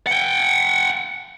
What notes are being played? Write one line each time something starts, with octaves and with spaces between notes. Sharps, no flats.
F#5 G5